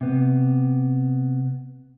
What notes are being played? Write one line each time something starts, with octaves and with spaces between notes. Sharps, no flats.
C3 B3